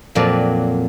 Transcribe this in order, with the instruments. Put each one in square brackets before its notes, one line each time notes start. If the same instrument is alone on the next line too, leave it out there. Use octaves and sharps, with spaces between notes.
[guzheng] F2 A#2 F#3 D5